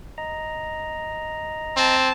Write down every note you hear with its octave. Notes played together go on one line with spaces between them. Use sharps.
D#5 A#5
C4 A5